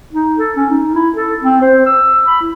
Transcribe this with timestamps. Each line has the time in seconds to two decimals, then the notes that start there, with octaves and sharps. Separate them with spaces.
0.13 D#4
0.39 A4
0.56 C#4
0.70 D#4
0.95 E4
1.16 A4
1.43 C4
1.61 C5
1.86 E6
2.27 B5
2.41 E4